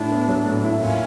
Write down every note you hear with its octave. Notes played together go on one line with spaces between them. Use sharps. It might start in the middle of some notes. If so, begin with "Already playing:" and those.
Already playing: A2 D4 E4
B3
F#3
A2
E4
A#2 C#4